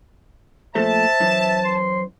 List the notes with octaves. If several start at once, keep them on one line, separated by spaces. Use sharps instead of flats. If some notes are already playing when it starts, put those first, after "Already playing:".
A#2 F3 A3 C5 E5 A5
F#2 E3
C6